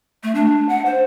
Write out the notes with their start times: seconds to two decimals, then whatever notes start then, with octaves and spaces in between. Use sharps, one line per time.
0.23 A3
0.35 D4
0.69 F#5
0.85 C5